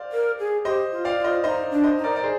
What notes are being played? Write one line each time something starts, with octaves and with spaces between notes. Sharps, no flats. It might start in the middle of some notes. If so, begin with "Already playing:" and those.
Already playing: C5 D5 F5
A#4
G#4
G4 C5 D#5
F4
D5 F5
F4
C5 D#5
D#4 C5 D#5
D4
C5 D#5
D#4
A#4 D5
D5
G#4 C5